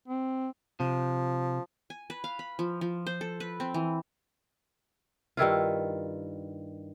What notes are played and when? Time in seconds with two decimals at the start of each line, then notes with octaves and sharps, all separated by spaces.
0.08 C4
0.80 C3 F3
1.90 G#5
2.10 B4
2.24 F5
2.39 B5
2.59 F3
2.81 F3
3.07 C5
3.21 A4
3.40 B4
3.60 C4
3.74 E3
5.37 G2 D#3 E4 F4